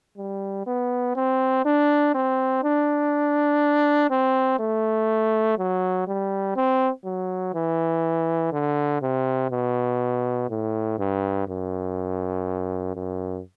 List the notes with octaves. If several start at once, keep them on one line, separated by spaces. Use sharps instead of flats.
G3
B3
C4
D4
C4
D4
C4
A3
F#3
G3
C4
F#3
E3
D3
C3
B2
A2
G2
F#2
F#2